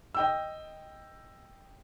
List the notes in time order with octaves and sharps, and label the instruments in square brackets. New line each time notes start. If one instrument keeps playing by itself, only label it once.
[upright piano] D#5 G5 E6